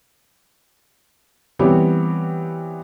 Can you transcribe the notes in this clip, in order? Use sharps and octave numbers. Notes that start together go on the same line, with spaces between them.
E3 G3 B3 C4 G4 C#5